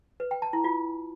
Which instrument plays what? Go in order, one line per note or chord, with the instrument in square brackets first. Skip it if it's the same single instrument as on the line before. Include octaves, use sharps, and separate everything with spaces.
[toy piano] B4
G5
A5
E4
F4